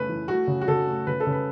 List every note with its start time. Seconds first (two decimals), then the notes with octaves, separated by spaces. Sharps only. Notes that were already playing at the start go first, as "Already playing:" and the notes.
Already playing: C#3 A3 B4
0.09 E3
0.28 A3 F#4
0.47 C#3
0.61 F#4
0.68 C#3 A4
0.87 A3
1.07 C#3 B4
1.20 A4
1.27 C#3
1.32 B4